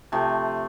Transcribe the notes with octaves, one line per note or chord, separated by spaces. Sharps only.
C3 F3 A3